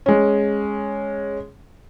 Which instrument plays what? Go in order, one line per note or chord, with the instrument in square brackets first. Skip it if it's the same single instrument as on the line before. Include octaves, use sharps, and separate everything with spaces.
[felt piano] G#3 C#4